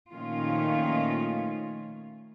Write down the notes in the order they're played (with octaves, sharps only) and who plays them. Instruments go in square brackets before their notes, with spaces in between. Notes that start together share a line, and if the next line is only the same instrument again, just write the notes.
[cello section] A#2 D#3 F3 A3 C#4 F4